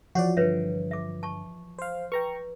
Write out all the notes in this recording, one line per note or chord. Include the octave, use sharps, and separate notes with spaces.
E3 F3 F#4 C#5 D5 F#5
G2 D3 B4 C#5 E5
E5 D6
A5 C#6
C5 F5
B4 G5 A#5 C#6